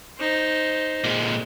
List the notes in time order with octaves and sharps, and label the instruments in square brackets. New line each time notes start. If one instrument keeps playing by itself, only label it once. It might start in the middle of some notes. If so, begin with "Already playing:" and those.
[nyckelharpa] D#4 C5
[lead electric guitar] A#2 G#3